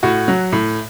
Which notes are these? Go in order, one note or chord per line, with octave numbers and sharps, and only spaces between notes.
A2 F#4
F#3
A2